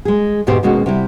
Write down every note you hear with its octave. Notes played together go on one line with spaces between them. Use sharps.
G#3 G#4
D2 G#2 B2 B3 G4 C5
D#2 B2 G#3 C#4 F#4
C3 G3 E4